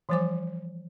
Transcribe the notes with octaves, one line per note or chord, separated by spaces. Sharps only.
E3 F3 G3 C5 G#5 D6